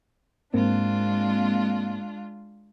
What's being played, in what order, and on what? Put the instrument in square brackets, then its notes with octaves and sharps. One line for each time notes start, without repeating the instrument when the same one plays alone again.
[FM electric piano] G#2 A#3 C4 [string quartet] G#3 D4 F4